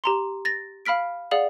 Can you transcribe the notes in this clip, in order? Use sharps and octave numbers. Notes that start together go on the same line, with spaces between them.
G4 A#5 C6
A6 A#6
F5 B5 F6 B6 D7
G#4 D5 F5 F#5 F#7